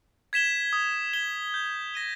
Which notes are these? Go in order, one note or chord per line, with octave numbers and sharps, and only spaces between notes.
G#6 B6 E7 G7
D#6
G#6 B6 E7 G7
G6
A#6 D#7 G7